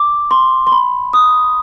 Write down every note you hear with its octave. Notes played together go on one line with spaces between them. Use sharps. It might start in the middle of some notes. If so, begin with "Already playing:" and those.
Already playing: D6
C6
C6
B5
D#6